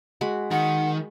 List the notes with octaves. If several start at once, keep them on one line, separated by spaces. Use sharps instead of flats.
G#3 F#4 B5
D#3 F#5 B5